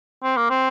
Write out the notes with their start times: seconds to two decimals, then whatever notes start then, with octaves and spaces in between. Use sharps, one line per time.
0.24 C4
0.37 A#3
0.50 C4